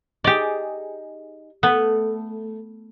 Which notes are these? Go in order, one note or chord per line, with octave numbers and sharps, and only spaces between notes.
D#4 G4 G#4 D5
A3 B3